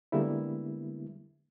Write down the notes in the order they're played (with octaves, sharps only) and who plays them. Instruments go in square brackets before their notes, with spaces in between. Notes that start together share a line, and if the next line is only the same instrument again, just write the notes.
[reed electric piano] D3 G3 G#3 A#3 B3 E4